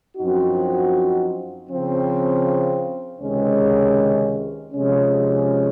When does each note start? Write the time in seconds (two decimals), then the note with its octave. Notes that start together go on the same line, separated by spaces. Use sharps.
0.16 F#2 F3 C4 D#4 F#4
1.69 C#3 F3 C4
3.20 C#2 C3 D#3 G#3 C#4
4.72 C3 F3 G#3 C#4